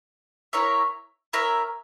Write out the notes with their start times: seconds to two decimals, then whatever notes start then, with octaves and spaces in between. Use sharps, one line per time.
0.53 E4 A#4 C#5 E5
1.33 E4 A#4 C#5 E5